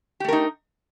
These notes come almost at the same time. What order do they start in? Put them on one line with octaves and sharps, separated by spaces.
G4 A3 A#4 D#4